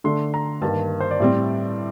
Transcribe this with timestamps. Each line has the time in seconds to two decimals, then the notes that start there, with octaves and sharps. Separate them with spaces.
0.04 D3 A3 D4 C6
0.34 A#5
0.61 G2 D#3 A#3 A5
1.00 C5
1.11 D5
1.20 A2 G3 C4